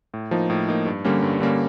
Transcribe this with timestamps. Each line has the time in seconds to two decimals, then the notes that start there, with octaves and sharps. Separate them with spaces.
0.14 A2
0.31 F3 A#3 D#4
0.50 A2
0.68 F3 A#3 D#4
0.86 G2
1.05 D3 G3 A#3 C#4
1.22 G2
1.40 D3 G3 A#3 C#4